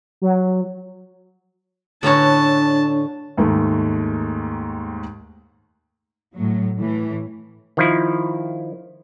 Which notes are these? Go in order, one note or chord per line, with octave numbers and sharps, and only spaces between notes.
F#3
A2 D3 C#4 D4 B4 A5 A#5
D#2 G#2 D#3 A3
A2 F#3
A2 E3
D#3 F3 E4